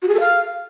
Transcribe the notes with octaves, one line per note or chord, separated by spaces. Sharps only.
F#4
G#4
A4
F5